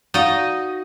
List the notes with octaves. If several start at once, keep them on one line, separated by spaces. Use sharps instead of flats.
D#4 F#4 D5 D#5 F5 A6